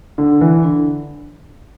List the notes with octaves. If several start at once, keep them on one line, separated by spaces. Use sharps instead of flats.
D3
E3
D3